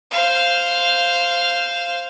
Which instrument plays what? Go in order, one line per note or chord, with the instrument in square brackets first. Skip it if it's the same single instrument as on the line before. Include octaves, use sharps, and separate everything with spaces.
[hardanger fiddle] C5 F5